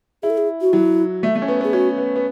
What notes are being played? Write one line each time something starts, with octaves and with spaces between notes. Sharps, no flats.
E4 G#4
A4
G#4
F#4
F#3 E4
A3
A3
C#4
B3
B3 G#4
C#4 F#4
B3
B3